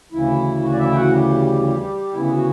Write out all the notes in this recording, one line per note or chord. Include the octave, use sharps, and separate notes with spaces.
D2 C#3 E3 E4
F#4
D5
E4 E5
G5
F#4 F#5
G3 G4
G3 G4
D2 C#3 E3 B3 E4
E4
F#4